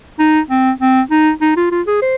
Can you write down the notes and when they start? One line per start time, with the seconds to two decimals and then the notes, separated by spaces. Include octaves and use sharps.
0.19 D#4
0.50 C4
0.80 C4
1.11 D#4
1.41 D#4
1.56 F4
1.71 F4
1.87 G#4
2.02 C5